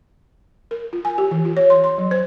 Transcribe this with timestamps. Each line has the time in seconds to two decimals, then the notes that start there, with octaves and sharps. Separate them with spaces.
0.71 A#4
0.93 F4
1.05 G#5
1.18 G4
1.31 E3
1.45 F4
1.57 C#5
1.70 C6
1.84 C6
1.98 F#3
2.11 C5